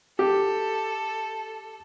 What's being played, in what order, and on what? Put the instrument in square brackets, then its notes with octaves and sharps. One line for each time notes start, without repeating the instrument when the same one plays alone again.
[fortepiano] G4 [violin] A4